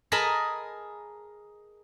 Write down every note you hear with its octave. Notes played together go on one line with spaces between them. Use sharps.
G#4 A#4 D#5 A5 B5